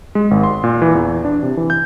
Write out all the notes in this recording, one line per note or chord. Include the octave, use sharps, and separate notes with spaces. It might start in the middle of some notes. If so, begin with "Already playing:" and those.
G#3
G#1
C6
A#2
E3
E2
D4
C3
E3
G6